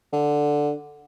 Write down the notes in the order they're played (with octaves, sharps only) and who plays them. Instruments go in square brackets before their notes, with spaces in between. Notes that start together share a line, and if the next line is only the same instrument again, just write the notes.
[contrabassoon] D3